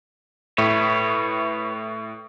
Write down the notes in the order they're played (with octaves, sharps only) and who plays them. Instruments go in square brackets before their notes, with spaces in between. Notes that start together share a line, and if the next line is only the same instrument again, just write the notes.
[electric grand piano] A2 E5 [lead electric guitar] B4 C#5